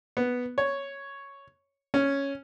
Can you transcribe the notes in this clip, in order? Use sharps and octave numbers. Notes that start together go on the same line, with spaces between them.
B3
C#5
C#4